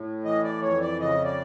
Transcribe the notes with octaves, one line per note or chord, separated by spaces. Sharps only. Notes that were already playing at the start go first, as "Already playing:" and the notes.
Already playing: A2
E3 D#5
D5
F2 C#5
D5
C#3 D#5
D5